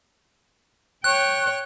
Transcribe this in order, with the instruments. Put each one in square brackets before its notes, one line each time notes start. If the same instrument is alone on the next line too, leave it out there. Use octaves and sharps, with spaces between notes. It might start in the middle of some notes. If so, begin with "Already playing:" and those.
[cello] C#5 G5 [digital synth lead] F#6